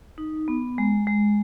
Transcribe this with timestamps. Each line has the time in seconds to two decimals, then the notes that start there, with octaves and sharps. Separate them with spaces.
0.18 D#4
0.48 B3
0.78 G#3
1.07 G#3